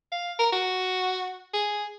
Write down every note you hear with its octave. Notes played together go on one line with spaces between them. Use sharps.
F5
A#4
F#4
G#4